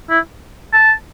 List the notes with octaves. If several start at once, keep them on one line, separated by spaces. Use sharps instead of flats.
E4
A5